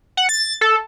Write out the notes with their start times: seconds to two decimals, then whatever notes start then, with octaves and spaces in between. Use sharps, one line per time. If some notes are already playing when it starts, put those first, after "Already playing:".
0.17 F#5
0.29 A6
0.61 A4